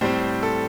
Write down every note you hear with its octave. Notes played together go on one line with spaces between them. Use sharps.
A2 G3 C4 C5
A4